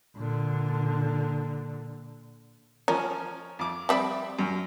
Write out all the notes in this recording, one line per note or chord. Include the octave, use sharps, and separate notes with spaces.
A#2 D3
F3 C#4 A#4
F2 D6
G3 C4 D5 E5 B5
F#2